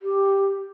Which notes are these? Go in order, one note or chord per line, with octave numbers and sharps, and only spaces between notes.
G4